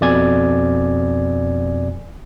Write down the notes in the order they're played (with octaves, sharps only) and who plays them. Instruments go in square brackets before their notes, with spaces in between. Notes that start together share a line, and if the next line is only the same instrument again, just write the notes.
[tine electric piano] F2 B2 D5 G#5 G#6